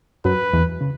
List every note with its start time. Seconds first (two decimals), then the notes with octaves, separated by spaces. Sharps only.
0.25 F#2 F#3 B4
0.53 E2 E3
0.81 C#3